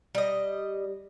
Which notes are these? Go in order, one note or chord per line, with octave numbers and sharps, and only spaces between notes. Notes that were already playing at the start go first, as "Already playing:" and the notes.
G3 D#5